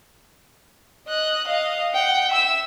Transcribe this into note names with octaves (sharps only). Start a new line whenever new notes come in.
D#5 F#6
D#5 F5
F#5 G5
E5 E6